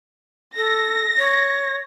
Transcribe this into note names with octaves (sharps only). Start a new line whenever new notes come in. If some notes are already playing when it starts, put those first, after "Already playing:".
A4 A#6
C#5